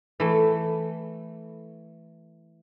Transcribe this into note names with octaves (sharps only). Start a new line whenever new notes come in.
E3 A3